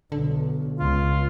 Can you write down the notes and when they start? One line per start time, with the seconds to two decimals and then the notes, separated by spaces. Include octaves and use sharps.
0.12 B1 D3
0.79 C#2 F4